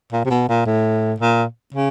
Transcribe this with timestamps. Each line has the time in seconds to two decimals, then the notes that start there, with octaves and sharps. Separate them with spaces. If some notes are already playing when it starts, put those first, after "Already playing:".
0.13 A#2
0.25 C3
0.30 B2
0.49 A#2
0.66 A2
1.20 A#2
1.74 C#3